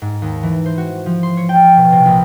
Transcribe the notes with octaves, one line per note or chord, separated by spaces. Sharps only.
G#2
D#2
E3
C5
F#4
F3
C6
C#5
G5
B2
C3
A#1